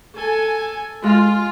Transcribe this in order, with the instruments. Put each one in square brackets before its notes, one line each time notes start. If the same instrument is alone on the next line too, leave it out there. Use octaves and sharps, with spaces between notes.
[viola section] A4 G#5
[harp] G#3 [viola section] F4